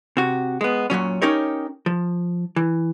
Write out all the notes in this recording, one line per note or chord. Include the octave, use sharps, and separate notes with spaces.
C3 F#4
G#3 B3
F#2 A#2 F#3 C#4
C#4 D#4 G4 A#4 C#5
F3
E3